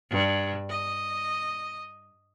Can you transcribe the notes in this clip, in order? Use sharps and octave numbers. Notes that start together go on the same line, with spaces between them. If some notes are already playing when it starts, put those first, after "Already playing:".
G2
D#5